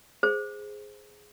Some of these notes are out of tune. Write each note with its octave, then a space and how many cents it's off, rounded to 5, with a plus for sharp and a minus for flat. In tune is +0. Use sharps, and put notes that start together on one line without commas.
G#4 +0 C5 +0